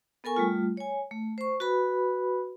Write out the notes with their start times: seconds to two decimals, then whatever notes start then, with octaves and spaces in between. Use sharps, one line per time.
0.24 B3 A4 A#4 G#5 C#6
0.36 G3 A3 F4
0.77 C#5 G#5
1.11 A3
1.38 C5 C#6
1.60 F#4 B4 B5